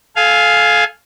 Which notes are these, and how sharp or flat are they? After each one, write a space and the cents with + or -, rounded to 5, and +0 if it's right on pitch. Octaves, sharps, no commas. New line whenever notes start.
A4 -30 F5 +0 G#5 +0